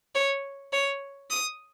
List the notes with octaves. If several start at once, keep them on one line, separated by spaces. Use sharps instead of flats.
C#5
C#5
D#6